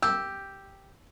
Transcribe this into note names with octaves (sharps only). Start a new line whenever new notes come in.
G4 E6